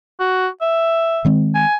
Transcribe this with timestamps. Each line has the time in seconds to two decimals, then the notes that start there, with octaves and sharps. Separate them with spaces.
0.20 F#4
0.62 E5
1.25 D#3 G#3 C4
1.55 G#5